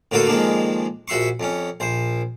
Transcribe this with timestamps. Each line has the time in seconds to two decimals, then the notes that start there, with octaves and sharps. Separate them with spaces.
0.11 A2 D3 A#3 F4 F#4 A4
0.27 F2 D#3 G#3 A#3 D4
1.08 A#1 F#4 E5 C6 C#6
1.40 F2 C#4
1.80 A#1 C5